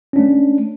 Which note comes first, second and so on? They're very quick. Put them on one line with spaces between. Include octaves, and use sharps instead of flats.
C#4 D4 A3